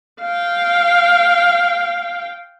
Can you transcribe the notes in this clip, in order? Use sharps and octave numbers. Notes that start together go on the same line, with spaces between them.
F5 G5